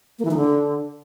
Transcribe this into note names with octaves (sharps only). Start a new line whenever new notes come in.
A#3
E3
D#4
D3